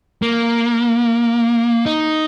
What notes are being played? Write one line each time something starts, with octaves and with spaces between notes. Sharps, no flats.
A#3
D#4